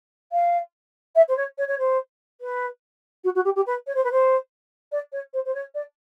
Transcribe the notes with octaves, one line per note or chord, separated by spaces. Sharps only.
F5
E5
C5
C#5
C#5
C#5
C5
B4
F#4
F#4
G4
G4
B4
C#5
C5
B4
C5
D5
C#5
C5
C5
C#5
D5